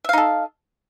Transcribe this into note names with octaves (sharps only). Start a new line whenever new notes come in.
D#4 A4 E5 F5